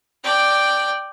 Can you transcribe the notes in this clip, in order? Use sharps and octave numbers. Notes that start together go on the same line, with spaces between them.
D5 G5